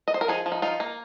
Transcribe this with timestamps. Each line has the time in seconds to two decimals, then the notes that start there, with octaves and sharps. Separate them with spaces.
0.08 D#5
0.14 C5
0.21 A#4
0.28 F3 D#4 G#4
0.46 F3
0.52 D#4
0.62 D#4 F4
0.80 A#3